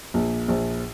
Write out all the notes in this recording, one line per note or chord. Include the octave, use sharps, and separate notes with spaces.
A#1
A#1